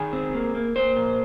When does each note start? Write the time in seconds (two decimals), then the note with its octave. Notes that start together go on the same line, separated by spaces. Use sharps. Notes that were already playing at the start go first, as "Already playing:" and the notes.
Already playing: D#3 G#4
0.13 C4
0.35 A#3
0.55 A#3
0.76 A#3 C5
0.96 A#2